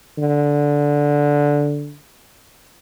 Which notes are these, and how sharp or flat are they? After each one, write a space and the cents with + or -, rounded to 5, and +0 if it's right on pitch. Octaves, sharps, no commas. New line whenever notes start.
D3 -10